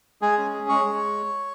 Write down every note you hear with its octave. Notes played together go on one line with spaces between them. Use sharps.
G#3 G#4 G#5
C#4
G#4
G#3 C#5 C#6
G#3